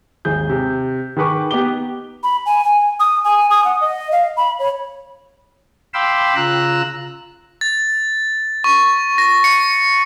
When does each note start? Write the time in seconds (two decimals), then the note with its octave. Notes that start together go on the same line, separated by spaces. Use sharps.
0.25 G#1 D#2 G#4 G6
0.49 C3
1.16 D#3 G#4 B4 C#6 D6
1.51 B3 D#4 G4 D6 G7
2.23 B5
2.46 G#5
2.65 G#5
3.00 D#6
3.24 G#5
3.50 D#6
3.65 F#5
3.81 D#5
4.12 F5
4.37 B5
4.59 C#5
5.94 F5 G5 B5 C6 D6 E6
6.36 C#3 F4 A#5 E6 F#6
7.61 A6
8.64 C#6
9.18 A#6
9.44 C#7